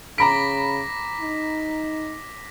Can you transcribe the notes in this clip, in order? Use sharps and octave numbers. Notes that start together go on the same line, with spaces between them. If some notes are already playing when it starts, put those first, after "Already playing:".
C#3 A#5 B5 D6 A#6 B6 D7
D#4